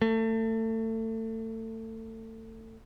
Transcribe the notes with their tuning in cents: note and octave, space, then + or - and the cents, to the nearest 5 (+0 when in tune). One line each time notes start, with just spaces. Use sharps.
A3 +30